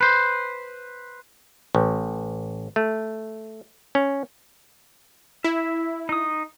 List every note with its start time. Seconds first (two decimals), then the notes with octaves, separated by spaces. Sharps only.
0.01 B4 C5
1.75 A1
2.76 A3
3.95 C#4
5.44 E4 E5
6.09 D#4 D#6